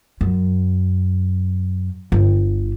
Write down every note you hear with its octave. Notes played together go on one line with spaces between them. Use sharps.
F#2
G1